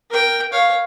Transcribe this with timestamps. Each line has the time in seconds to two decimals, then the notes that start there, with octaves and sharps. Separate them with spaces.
0.10 A#4 G5
0.52 C#5 F5